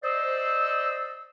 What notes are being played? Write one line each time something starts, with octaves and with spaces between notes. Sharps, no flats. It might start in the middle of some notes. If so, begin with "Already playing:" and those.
C5 D5 D#5 E6